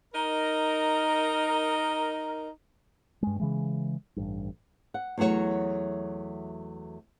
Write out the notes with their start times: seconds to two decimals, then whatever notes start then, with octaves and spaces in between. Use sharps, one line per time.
0.13 D#4 A#4
3.23 G2 G#3
3.40 C#3 E3 G#3
4.16 A1 G2
4.94 F#5
5.18 E2 F#3 A3 F#4 C#5